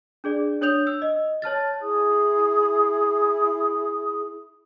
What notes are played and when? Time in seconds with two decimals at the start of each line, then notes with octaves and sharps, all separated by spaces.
0.24 D4 G#4 D5
0.61 D4 C#5 D#6 G6 F7
0.87 E6
1.02 D#5
1.42 C#5 A5 F6 A6
1.82 E4 G#4 D#6